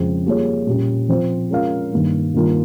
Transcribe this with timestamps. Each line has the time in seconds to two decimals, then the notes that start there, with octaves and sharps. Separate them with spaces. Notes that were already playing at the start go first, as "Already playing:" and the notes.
Already playing: F2 C#3 F3 G#3 C4
0.26 G3 A#3 F4 G#4 C#5
0.67 A#2 G3 C#4
1.09 F3 C4 F4 C5
1.50 G#3 C#4 F4 A#4 F5
1.93 G2 D#3 A#3
2.34 G2 D#3 A#3 F4 A#4